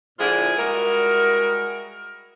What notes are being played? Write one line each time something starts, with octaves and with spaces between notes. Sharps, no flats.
A#2 D3 F3 E4 F4 G#4
G3 G#3 E4 F#4 A#4